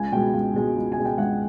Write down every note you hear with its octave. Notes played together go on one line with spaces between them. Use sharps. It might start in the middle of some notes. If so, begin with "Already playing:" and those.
Already playing: C#2 G#5
B2 G#3 G5
C#2
B2 G#3
C#2
G#5
B2 G#3
G5
C#2 F#5